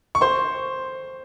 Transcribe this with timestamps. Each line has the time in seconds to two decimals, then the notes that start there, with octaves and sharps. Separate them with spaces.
0.15 C#6
0.21 C5 C6